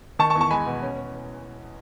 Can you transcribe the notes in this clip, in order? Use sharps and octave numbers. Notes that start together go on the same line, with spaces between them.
D#3 A5 C#6
A5 C#6
E2
A5 C#6
G#3 G#5 B5
B2
C#4
C#4